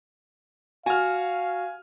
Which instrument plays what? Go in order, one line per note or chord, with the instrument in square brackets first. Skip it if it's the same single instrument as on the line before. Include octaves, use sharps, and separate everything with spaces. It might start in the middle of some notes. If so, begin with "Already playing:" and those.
[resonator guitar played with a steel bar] F#4 [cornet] F5 [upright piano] G#5 F6